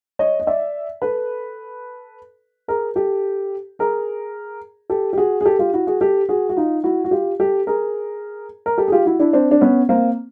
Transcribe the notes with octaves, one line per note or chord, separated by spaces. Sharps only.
C#5 D#5
D#5
D5 E5
A4 B4
G#4 A#4
G4 A4
G#4 A#4
G4 A4
G4
F#4 G#4
G#4
G4 A4
F4 G4
E4 F#4
F#4 G#4
G4 A4
F#4 G#4
F#4
D#4 F4
E4 F#4
F#4
F4 G4
G4 A4
G#4 A#4
A#4
G4 A4
G#4
F4 G4
E4 F#4
D4 E4
C4 D4
D4
B3 C#4
A#3 C4